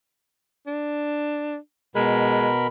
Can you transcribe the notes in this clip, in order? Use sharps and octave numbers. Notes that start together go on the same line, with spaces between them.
D4
B2 G#3 A#4 B5